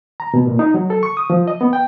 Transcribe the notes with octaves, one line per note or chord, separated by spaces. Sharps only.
A#5
B2
A#2
D#4
F#3
A4
C#6
D#6
F3
D#5
B3
G5